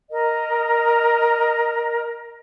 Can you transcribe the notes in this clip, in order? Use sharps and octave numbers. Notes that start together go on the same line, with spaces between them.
A#4 D#5